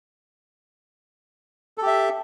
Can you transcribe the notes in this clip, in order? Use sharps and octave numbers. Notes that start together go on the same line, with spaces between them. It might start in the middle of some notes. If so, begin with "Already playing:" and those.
G4 A4 E5